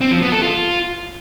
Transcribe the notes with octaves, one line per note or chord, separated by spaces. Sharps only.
C4
F3
B3
A4
F4